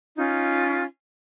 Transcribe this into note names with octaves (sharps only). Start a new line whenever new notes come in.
C#4 D#4 F4